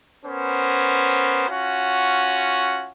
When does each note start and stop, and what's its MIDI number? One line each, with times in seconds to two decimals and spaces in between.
0.25 1.48 59
0.25 1.48 61
0.25 1.48 70
0.25 1.48 72
1.48 2.92 61
1.48 2.92 65
1.48 2.92 66
1.48 2.92 78